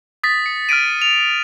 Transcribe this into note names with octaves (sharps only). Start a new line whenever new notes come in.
D#6 A6 B6
C#7
F6 A6 B6 D7 D#7
F7